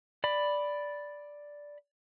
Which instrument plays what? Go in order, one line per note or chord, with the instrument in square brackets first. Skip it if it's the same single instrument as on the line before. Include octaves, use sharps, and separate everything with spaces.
[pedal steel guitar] D5 B5